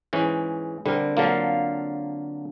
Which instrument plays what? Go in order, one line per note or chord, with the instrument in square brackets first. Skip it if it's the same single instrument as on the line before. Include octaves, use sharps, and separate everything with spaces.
[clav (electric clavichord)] G#2 E3 C#4
[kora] D3 C4 A#4 [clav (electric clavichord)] G3
[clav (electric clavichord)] D3 F#3 A#3 [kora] F4 A4 F5